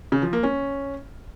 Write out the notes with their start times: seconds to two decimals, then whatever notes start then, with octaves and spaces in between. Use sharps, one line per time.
0.12 C#3
0.22 F3
0.33 A#3
0.43 C#4